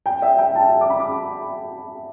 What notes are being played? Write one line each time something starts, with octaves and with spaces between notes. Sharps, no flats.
G5
E5
G5
A5
D6
B5
D6